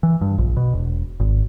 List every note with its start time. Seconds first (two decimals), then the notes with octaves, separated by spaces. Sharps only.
0.03 E3
0.21 G2
0.38 A#1
0.57 B2
0.73 E1
1.20 G#1